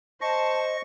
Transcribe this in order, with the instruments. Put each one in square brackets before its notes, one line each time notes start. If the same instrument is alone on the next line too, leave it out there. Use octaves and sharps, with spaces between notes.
[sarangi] C5 [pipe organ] D#5 [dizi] A5 [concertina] C#6